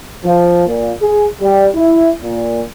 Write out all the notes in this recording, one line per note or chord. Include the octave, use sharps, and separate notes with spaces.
F3
A#2
G#4
G3
E4
A#2